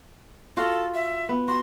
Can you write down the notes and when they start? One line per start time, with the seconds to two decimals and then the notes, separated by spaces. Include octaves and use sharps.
0.57 F4 F#4 A4
0.94 E5
1.29 B3
1.48 F#4 C6